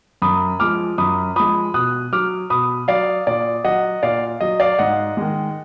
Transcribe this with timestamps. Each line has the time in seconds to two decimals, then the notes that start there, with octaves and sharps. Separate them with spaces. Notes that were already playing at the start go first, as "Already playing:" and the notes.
0.22 F#2 B5 D#6
0.60 F3 G#3 D6 F6
0.98 F#2 B5 D#6
1.36 F3 G#3 B5 D#6
1.74 B2 D#6 F#6
2.13 F#3 D6 F6
2.50 B2 B5 D#6
2.88 F#3 D5 F5
3.27 A#2 D5
3.64 F#3 D#5 F#5
4.03 A#2 D5 F5
4.41 F#3 D#5
4.60 D5 F5
4.79 G#2 D#5 F#5
5.17 D#3 G#3